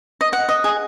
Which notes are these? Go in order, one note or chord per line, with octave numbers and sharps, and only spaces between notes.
D#5
D#5 F#5
D#5
G#4